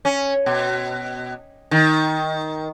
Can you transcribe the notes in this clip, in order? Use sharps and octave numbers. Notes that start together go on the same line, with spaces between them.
C#4
B2
D#3